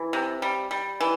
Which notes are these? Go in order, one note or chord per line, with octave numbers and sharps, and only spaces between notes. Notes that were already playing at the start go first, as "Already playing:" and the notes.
Already playing: E3
C3
G3
G3
E3